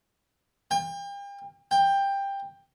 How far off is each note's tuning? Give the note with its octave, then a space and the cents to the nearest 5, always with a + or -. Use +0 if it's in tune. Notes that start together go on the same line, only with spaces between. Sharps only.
G5 +40
G5 +15